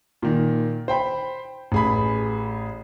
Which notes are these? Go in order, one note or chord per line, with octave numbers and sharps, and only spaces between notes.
A#2 D#3
C5 G5 B5
A1 G#4 B5